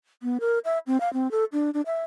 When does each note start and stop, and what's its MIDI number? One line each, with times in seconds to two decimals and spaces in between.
0.23 0.38 59
0.40 0.59 70
0.65 0.79 76
0.87 1.00 60
1.00 1.11 77
1.13 1.30 60
1.31 1.45 69
1.53 1.70 62
1.74 1.81 62
1.86 2.04 76